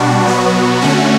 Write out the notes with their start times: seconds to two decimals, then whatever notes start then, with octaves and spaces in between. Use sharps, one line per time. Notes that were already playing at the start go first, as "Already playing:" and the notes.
Already playing: B2 G3 D4 F#4
0.24 B2 F#3 B3 F#4
0.81 D3 A3 C#4 F#4